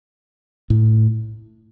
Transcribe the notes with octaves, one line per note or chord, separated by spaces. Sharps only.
A2